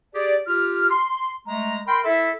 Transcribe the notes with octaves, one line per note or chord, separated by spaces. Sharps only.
G4 G#4 D5
F4 G4 F6
C6
G#3 A3 A#5
A#4 G5 B5 C6
E4 A4 E5